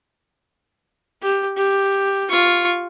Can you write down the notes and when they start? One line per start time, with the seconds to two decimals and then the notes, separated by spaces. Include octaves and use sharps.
1.22 G4
1.57 G4
2.29 F4 C#6